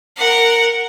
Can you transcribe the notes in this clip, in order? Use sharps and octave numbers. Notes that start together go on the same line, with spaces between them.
A#4 F#5